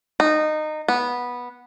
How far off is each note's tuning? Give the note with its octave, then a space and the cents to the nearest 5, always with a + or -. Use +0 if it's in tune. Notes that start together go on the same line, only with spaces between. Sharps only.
D#4 -20
B3 -10